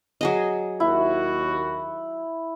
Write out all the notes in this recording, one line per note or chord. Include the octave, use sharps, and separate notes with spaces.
F#3 G#4 D#5
D#2 E4 F#4